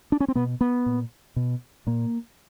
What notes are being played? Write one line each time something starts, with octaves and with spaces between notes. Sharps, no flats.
D4
C#4
C4
B2 B3
B3
A#2
B2
A#2 A#3